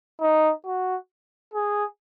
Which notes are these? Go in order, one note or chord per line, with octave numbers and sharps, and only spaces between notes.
D#4
F#4
G#4